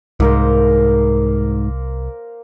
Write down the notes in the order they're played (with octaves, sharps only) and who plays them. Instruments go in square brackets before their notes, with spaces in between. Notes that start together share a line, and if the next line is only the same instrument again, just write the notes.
[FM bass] C2 [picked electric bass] G#2 [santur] A#3 A#4 C5